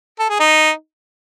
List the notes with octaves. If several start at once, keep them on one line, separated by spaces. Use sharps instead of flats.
A4
G#4
D#4